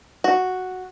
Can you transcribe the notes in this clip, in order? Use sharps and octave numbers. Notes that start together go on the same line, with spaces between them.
F#4